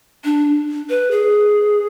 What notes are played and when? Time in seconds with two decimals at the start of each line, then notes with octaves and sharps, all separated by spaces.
0.25 D4
0.90 B4
1.11 G#4